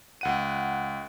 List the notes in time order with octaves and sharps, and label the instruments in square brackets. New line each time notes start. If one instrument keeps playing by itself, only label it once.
[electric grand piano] C#2 F#5 D#7